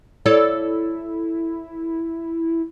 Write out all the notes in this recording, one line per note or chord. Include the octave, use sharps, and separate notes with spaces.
E4 A4 C#5 D5